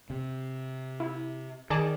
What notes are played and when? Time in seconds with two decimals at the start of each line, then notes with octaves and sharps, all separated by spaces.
0.10 C3
1.00 E4
1.70 D#3 G#4 D5 A5